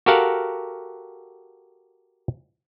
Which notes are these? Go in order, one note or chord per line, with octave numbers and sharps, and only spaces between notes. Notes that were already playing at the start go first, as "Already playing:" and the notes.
F#4 G4 A4 A#4 F5 F#5